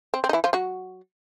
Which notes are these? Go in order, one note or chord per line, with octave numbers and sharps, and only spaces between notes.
C4
C4
D#4
E3 E4
F3 F4
F#3 F#4